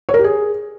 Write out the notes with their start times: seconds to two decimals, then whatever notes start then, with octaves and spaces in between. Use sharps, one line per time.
0.09 C#5
0.14 A#4
0.19 G4
0.24 G#4